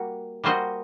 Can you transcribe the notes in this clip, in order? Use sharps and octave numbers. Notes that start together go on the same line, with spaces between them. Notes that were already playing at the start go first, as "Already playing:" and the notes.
Already playing: G3 A#3 F#4
G3 A#3 F#4 C5 D#5